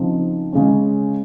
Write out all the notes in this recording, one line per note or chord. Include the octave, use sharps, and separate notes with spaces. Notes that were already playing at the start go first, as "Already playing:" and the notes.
Already playing: C#3 F3 C4 D#4
C#3 G#3 C#4